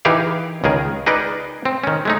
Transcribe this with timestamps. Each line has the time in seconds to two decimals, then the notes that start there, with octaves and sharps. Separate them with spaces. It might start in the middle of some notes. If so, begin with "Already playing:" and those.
0.05 E3 D#4 G4 G#4 A#4 F5
0.64 C#2 D#3 G#4 A#4
1.06 D#4 G#4 A#4 B4 D5 D#5
1.65 C4
1.84 D#3 C#4
2.05 G#3 A3 D#4